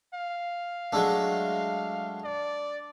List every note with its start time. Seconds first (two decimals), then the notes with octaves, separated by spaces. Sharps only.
0.14 F5
0.92 F#3 G#3 A3 D4
2.24 D5